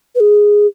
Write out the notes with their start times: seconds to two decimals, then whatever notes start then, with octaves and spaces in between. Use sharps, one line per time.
0.15 B4
0.20 G#4